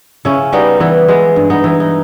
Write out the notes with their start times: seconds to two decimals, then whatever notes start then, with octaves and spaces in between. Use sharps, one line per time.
0.25 C#3 C#4 E4
0.52 G3 B3 D#4
0.80 E3 B3
1.08 G#3 B3
1.36 G2
1.50 B3 D#4
1.64 E3
1.80 D#4